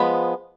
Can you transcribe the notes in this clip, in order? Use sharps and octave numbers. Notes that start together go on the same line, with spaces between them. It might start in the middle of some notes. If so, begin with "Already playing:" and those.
Already playing: F3 G#3 B3 B5